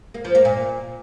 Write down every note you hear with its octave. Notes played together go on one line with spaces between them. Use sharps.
A#3
F3
A#3
A#2